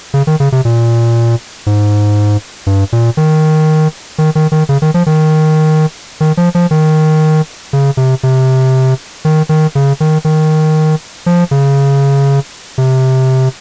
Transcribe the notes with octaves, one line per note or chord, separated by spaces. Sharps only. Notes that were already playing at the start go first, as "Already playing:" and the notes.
C#3
D#3
C#3
C3
A#2
G#2
G2
A#2
D#3
D#3
D#3
D#3
C#3
D#3
F3
D#3
D#3
F3
F3
D#3
C#3
C3
C3
D#3
D#3
C#3
D#3
D#3
F3
C#3
C3